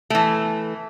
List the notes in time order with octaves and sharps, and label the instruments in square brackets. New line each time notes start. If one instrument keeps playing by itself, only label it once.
[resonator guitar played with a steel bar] E3 A3